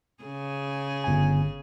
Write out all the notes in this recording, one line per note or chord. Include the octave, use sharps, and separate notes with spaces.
C#3 G#4
G1 G#5